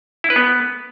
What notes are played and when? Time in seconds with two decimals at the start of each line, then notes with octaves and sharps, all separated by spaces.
0.24 E4
0.30 B4
0.36 B3